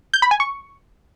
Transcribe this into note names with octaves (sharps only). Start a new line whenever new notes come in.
G6
B5
G#5
C#6